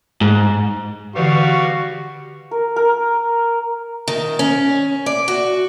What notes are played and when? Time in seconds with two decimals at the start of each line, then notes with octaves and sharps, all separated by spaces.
0.21 G#2
1.16 D3 E3 G3 F#4 B4 F5 C#6
2.51 A#4
2.76 A#4
4.08 D#3
4.39 C#4
5.06 D5
5.28 F#4